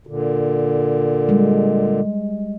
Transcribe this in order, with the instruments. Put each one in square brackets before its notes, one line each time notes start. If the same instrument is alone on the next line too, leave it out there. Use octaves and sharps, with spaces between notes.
[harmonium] A#2 D3
[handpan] G3 G#3